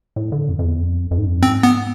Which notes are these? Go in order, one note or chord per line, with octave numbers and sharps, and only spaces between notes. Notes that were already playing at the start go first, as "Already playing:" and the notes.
A2
D3
F2
F2
E2
F2
F2
G#2
F2
G#2 C4
B3